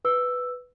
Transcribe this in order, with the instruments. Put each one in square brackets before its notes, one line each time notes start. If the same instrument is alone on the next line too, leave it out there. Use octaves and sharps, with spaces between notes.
[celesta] B4 E6